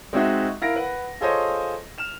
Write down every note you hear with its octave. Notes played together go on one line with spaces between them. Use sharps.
G#3 C4 D#4 F#4 E5
E4 A#4 F5 A#6 D7
B4 F#5
F4 G#4 A4 C5 C#5 D#5
F6 E7 F7